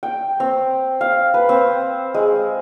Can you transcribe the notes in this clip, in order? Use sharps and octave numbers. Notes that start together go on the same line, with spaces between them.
G5
C4
F5
B4
C4
G#3